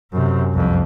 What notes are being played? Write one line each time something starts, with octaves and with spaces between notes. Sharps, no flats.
F#2 C3
C2 F2